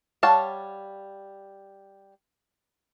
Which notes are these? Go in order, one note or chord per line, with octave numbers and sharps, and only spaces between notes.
G3 C#5 F5 F#5 A5